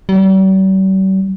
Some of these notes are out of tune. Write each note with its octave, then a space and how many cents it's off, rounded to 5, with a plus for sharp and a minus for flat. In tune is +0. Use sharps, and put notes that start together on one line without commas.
G3 -45